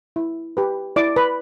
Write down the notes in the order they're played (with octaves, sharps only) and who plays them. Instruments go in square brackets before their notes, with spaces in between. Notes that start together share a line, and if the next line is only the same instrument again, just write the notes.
[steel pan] E4
G4 B4
E4 D5 D6
B4 B5